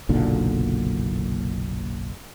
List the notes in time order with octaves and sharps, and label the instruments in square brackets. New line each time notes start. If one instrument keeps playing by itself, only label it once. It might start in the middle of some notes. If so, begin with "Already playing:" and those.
[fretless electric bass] F#1 B1 A#2 D3